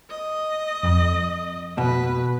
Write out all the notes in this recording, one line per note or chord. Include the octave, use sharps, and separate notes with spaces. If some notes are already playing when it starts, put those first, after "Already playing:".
D#5
F2
B2 B4